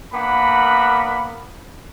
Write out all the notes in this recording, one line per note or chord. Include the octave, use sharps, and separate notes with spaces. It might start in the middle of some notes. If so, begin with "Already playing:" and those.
A#3 B3 D4 F#5 B5